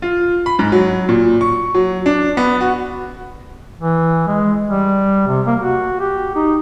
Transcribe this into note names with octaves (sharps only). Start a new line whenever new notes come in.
F4
B5
G#2
F#3
A#2
C#6
F#3
D4
B3
F#4
E3
G#3
G3
C3
A#3
F#4
G4
D#4